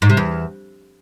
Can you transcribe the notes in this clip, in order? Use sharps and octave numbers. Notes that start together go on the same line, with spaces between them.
G#2
C3
E2